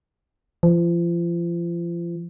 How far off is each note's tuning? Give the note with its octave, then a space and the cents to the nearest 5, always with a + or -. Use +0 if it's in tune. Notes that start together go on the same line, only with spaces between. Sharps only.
F3 -35